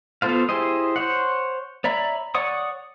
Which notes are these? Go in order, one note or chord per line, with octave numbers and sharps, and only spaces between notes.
B3 F4 A4 C5 F5
E4 G4 G#4 C5 D#5
C5 C#5 F#5
C#5 D5 E5 A#5 B5
C#5 D5 F#5 C#6 D#6